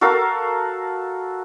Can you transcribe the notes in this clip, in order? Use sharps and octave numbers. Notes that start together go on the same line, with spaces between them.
F#4 A4 A#4 F5